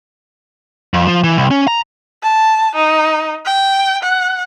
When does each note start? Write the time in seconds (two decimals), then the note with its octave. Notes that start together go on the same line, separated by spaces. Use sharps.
0.94 F2
1.07 F3
1.24 E3
1.37 C2
1.51 C#4
1.67 A#5
2.23 A5
2.76 D#4
3.45 G5
4.03 F#5